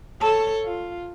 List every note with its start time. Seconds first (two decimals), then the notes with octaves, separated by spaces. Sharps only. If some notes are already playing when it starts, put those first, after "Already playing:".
0.21 A4 C#5 A5
0.65 F4